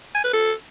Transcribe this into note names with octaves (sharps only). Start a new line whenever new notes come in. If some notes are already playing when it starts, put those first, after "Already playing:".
G#5
B4
A4